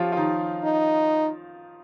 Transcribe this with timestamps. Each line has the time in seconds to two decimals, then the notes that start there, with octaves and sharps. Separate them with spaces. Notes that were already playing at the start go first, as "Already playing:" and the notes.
Already playing: F3 C#4 F4 G4 C#5
0.12 F4
0.16 D#3 D#4
0.64 D#4